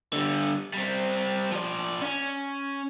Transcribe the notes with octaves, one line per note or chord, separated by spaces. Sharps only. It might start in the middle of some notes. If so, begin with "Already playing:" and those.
D3 G3
G3 C4
F3 D5
C#4 G#5